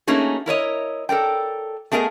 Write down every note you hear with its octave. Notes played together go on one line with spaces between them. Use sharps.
A3 A#3 C#4 D#4 F#4 G#4
E4 A#4 C#5 D#5
A4 A#4 D5 G5
A3 B3 G#4 A#4 D#5